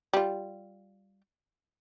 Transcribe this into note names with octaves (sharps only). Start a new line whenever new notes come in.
G3 F4